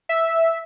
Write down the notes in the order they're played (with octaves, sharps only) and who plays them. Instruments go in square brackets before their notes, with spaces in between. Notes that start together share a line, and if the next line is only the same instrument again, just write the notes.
[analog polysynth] E5